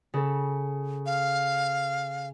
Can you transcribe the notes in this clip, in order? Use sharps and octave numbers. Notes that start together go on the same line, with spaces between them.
C#3 A4
F5